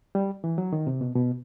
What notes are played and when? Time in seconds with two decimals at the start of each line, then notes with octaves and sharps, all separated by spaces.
0.15 G3
0.44 E3
0.58 F#3
0.73 D#3
0.87 C3
1.01 B2
1.15 B2